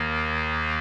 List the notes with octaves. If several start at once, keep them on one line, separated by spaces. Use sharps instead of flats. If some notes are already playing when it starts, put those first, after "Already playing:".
Already playing: D#2 D#3 A#3